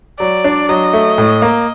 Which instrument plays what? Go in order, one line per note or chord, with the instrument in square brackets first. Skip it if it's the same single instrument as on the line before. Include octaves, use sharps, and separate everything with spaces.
[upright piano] F#3 [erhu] D5
[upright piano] D4
[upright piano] F#3 [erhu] D#5
[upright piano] A3
A2
A#3